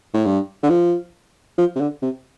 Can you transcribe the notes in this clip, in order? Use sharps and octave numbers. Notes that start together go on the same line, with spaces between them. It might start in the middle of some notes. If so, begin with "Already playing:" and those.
A2
G2
D3
F3
F3
C3
D3
C3